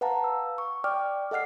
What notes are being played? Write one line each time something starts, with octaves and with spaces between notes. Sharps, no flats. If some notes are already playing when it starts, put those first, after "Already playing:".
B4 F5 F#5 A5 A#5
E6
C#6
D5 G5 D6 F6
A4 D#5 F#5 F6 C7